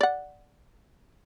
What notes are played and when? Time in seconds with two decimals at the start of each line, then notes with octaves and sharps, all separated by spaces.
0.01 D5 F#5